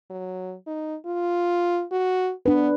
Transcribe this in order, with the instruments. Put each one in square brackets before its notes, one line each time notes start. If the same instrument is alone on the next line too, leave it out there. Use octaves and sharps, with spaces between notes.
[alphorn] F#3
D#4
F4
F#4
[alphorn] B3 [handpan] D4 B4